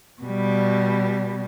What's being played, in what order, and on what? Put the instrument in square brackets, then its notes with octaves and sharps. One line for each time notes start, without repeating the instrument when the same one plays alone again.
[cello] B2 G3